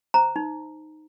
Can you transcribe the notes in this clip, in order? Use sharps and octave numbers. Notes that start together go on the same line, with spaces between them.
C5 A#5
D#4